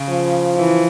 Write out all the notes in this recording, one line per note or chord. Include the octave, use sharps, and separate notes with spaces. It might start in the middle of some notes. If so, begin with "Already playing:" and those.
Already playing: C#3
F3
E3